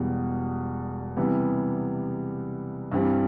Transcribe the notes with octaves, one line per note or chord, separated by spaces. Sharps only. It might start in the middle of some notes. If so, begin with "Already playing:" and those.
Already playing: E1 E2 B2 G3
C3 E3 G3 B3
G2 E3 G3 C4